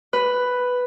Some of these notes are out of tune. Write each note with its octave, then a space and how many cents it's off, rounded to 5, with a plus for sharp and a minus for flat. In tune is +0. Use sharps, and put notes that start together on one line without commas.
B4 +5